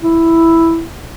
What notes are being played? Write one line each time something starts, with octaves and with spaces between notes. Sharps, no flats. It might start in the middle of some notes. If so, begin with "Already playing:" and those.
E4